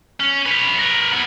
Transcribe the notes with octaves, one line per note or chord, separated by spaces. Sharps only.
C#4
B4 C#5
A#4 B4
B3 E4